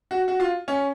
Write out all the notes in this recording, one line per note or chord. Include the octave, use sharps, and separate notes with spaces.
F#4
F#4
F4
C#4